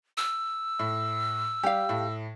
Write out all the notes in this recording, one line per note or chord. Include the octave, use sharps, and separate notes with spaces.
E6
A2
G3 G4 F5
A2